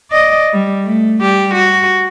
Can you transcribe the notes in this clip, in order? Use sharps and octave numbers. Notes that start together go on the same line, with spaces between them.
D5 D#5
G3
A3
G3 G4
F#4